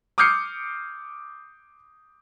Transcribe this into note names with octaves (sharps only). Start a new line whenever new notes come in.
D6 D#6 F6 G6 C7 C#7